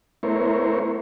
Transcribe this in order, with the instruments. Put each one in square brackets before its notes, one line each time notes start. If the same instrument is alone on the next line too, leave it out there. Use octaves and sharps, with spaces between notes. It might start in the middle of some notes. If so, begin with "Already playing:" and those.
[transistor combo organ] A3 B3 E4 A#4 C5 C#5